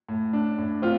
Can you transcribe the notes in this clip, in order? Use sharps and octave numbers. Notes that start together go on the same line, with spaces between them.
A2
D4
A2
C4 F4